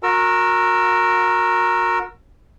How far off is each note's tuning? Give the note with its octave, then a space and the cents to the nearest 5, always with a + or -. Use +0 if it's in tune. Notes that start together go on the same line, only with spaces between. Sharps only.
F#4 -30 A#4 +0 E6 +25